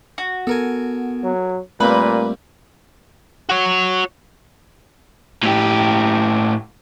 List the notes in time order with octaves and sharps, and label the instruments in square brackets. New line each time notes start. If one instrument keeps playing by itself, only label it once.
[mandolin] F#4
[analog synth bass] B3 [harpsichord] A4 A#4 G#5
[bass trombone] F#3
[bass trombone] A#2 [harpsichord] G3 A#3 C4 [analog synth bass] A3 [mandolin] B4
[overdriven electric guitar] F#4 C#5
A2 G4